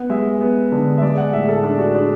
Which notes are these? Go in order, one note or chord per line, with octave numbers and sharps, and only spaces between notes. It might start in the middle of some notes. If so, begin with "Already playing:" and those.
Already playing: B3 F#5
G#3 E5
B3
D3
E5
G#3 D5
F#5
A2 E5
G#4
A4
D4 A4
F#4
D4 G#4